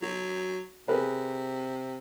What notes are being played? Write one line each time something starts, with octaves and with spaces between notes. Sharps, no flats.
F#3 F#4
C3 G#4 A#4 B4